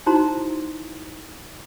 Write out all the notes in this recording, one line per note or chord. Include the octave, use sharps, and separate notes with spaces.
D#4 E4 F#4 C5 A#5 C6